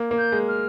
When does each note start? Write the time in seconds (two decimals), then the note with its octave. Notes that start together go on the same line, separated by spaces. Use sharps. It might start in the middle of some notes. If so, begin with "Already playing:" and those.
Already playing: A#3
0.11 A#3
0.18 G6
0.32 G#3
0.48 F6